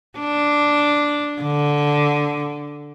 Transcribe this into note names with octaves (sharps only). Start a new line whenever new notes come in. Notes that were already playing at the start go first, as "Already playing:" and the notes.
D4
D3